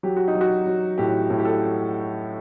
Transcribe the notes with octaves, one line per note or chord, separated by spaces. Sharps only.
F#3 G4
F#4
D#4
F#3
F#4
F#3
A2 G4
A2
G4
A4